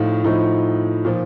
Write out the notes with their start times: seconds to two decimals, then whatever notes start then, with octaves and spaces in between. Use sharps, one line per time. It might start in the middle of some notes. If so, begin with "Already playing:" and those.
Already playing: A2 F3 D#4 F4
0.24 A2 F3 D#4
1.05 A#2 F3